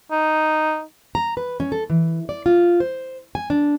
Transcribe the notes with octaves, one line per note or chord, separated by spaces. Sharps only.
D#4
A#5
B4
C#4
A4
E3
D5
F4
C5
G#5
D4